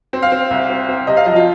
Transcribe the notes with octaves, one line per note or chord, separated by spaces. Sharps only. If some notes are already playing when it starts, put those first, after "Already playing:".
C4
F5
C4
C2
C4
C4
C3 D#5
F5
F3 D#5
F4